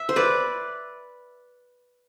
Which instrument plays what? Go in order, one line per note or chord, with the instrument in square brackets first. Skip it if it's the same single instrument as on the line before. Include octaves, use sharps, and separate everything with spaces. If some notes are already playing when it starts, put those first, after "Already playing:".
Already playing: [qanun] E5
C5
B4 D5